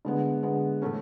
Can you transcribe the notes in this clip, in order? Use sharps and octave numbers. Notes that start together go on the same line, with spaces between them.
D3 G#3 B3
D3 G#3 B3
A2 E3 A3 C#4